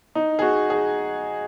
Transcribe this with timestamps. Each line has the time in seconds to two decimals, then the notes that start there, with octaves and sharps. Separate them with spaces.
0.15 D#4
0.39 G#4
0.42 F#4
0.70 G#4